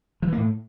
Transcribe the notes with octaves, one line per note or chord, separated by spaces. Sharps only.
F3
E3
A#3
A2